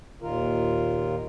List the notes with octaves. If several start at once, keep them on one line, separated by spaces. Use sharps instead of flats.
D#2 A#2 D#3 F4 A#4